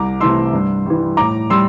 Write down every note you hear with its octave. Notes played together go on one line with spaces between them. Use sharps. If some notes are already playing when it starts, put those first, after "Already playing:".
Already playing: C2 A#5 D6
C3 E3 A3 C6 E6
G2
E3 G3
A2 A#5 D6
G3 C6 E6